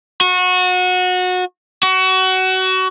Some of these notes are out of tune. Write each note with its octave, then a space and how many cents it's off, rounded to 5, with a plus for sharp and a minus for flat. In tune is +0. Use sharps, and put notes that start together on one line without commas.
F#4 -25
F#4 +25